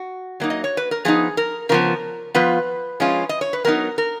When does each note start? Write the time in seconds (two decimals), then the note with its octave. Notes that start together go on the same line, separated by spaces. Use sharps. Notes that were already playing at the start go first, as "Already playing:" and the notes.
Already playing: F#4
0.40 F#3 A#3 D#4
0.50 D#5
0.64 C#5
0.77 B4
0.91 A#4
1.05 F3 B3 D#4 G#4
1.37 A#4
1.69 C#3 F3 B3 A#4
2.35 F3 B3 F4 B4
3.00 F3 G#3 C#4 F4
3.29 D#5
3.41 C#5
3.53 B4
3.65 F#3 B3 D#4 A#4
3.98 A#4